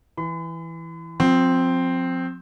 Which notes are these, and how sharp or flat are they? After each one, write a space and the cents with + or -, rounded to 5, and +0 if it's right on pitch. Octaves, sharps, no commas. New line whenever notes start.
E3 +0 B5 +45
F3 +35 C4 +0